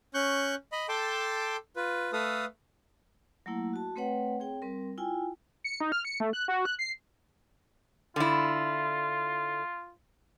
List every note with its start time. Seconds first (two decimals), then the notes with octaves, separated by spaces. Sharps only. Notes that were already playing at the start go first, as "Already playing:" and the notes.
0.14 C#4 C#6 F#6 G6
0.72 D#5 B5
0.89 A4 G5 A5 C6 D6
1.76 F4 B4
2.13 A3 A4 B4 F5 D#6
3.46 F#3 A3 A#3 E4 F#5
3.73 F#4 A5
3.96 A3 C4 B4 C#5 F#5 G5
4.40 C4 G#4 C#5 G5
4.62 G3 C4 A#4
4.98 E4 F4 G5 G#5
5.64 C#7
5.81 D#4
5.92 F6
6.05 C#7
6.20 A3
6.33 F#6
6.48 F#4
6.65 F#6
6.79 C7
8.16 D3 E4 F4